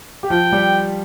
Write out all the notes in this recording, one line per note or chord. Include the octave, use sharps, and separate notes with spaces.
G4
F3 F4 G5
G3 G4